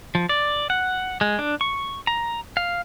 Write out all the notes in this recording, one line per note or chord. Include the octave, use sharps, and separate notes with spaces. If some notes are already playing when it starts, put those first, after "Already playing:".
F3
D5
F#5
G#3
D4
C#6
A#5
F5